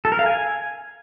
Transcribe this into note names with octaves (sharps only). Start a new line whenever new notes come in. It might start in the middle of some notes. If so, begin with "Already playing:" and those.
A4
A#4
F5
G#5